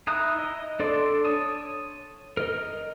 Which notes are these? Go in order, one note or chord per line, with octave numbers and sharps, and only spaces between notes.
D#4 E4 A#5 D#6 F#6
D#5
D4 A4 D5 C6 D6
C#5 A5 D#6
A#4 D#5